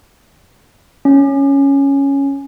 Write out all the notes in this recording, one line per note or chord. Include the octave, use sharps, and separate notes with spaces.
C#4